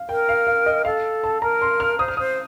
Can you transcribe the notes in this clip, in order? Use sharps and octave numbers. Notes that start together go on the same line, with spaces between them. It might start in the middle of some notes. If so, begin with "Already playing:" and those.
Already playing: F5
A#4 G5
F5
F5
D#5
A4 F5
A5
A#4 A#5
C6
F6
C5 D#6
F6
C5 D#6